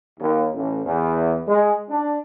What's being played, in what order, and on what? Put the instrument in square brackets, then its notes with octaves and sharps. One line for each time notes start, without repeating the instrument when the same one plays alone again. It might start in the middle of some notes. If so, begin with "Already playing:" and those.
[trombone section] D#2
A1
E2
G#3
D4